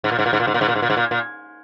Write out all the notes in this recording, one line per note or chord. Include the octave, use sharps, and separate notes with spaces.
G#2
A#2
G#2
A#2
G#2
A#2
G#2
A#2
G#2
A#2
G#2
A#2
G#2
A#2
A#2